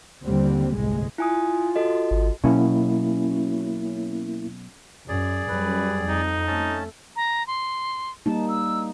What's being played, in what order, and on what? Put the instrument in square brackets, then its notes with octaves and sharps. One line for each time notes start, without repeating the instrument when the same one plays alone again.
[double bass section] D#2 D3 G3 C4
G1 C2 A2 G#3
[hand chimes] E4 G#5 D#6 [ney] F4
[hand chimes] F#4 A4 D#5
[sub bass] G#1
[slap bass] B2 F#3 [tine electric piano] A#3 E4 [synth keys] C#4
[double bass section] F#2 [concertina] G#4 D5
[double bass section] F#2 G3 [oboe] B4
[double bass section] F2 [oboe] D#4
[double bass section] A3 [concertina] C#4 A5
[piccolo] A#5
C6
[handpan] G3 A#3 D#4 [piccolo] A5
[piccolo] E6